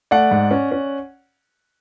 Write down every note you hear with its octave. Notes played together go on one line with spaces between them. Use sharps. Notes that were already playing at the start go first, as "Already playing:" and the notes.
A3 D5 F#5
G#2
C#4
C#4